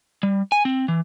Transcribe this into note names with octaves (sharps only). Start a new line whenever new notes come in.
G3
G#5
C4
E3